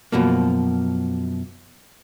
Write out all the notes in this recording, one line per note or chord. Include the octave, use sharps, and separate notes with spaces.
F#2 B2 F3 A#3